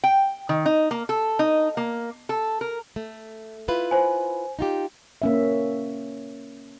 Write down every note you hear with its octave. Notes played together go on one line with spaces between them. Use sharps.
G5
D#3
D#4
A#3
A4
D#4
A#3
A4
A#4
A3
E4 F4 B4
C5 G#5
D#4 F4 G4
A#3 C#4 E5